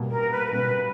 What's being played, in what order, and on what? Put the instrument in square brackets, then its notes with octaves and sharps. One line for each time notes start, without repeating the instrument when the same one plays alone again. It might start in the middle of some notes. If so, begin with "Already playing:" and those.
Already playing: [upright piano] B2 G3 A#3
[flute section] A#4
B4
A#4
[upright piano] B2 G3 A#3 [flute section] B4